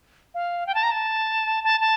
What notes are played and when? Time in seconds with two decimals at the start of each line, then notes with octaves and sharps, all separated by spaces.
0.34 F5
0.67 G5
0.75 A5
0.83 A#5
0.91 A5
1.64 A5
1.81 A5